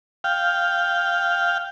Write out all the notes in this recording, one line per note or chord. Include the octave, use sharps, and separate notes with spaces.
F5 G5